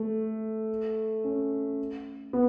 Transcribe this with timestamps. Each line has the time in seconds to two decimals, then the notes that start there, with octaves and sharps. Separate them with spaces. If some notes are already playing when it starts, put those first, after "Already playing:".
Already playing: A3
1.24 C#4
2.33 B3